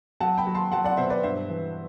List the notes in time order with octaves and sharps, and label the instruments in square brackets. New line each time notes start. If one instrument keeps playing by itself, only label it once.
[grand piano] F#3 F#5 A5
G5 B5
F#3
A5 C6
F#3 F#5 A5
D5 F#5
B2 C5 E5
B4 D5
G2 C5 E5
E3